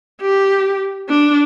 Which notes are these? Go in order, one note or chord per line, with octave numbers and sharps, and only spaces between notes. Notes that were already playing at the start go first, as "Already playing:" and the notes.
G4
D4